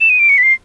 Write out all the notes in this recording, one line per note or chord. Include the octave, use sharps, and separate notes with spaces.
E7
D#7
D7
C#7
B6
C7